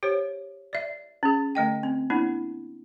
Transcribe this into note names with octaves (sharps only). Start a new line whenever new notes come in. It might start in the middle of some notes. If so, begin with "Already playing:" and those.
G4 C5 C#5
D5 E5
C#4 G#4
D3 A3 D#5 G5
C4
A#3 B3 D4 E4